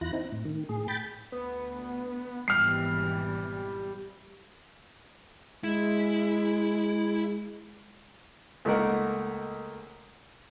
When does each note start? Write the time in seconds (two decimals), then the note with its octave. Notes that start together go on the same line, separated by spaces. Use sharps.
0.01 E2 E4 F4 F#6 A#6
0.13 C4 D#4 E4
0.32 A2
0.45 D#3
0.69 A2 G#4
0.88 G5 B5 G6 A6
1.32 D2 B3
2.48 G#1 B2 E3 G3 F6 C7
5.64 G#3 E4
8.65 C#2 A3 A#3 D#4 A#4 F#5